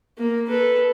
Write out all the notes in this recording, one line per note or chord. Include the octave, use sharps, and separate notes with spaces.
A#3
A4 B4